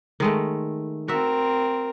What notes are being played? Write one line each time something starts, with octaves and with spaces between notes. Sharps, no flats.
D#3 G#3 A3
C4 F#4 A#4 E5